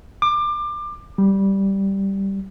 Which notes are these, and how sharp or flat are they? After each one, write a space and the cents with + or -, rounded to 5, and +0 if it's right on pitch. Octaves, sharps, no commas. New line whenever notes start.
D6 +25
G3 -5